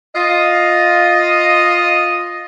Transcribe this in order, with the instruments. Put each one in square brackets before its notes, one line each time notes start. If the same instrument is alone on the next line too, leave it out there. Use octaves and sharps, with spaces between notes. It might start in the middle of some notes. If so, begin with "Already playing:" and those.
[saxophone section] F4 D#5